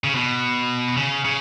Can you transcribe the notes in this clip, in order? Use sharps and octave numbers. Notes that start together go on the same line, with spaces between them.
C#3
B2
C#3
C#3